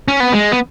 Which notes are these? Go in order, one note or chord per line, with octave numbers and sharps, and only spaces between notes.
C#4
B3
G#3
B3